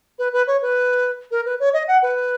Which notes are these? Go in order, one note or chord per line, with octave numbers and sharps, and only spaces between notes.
B4
B4
C#5
B4
A#4
B4
C#5
D#5
F#5
B4